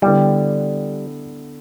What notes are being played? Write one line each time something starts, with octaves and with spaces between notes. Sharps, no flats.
D3 G3 B3 E4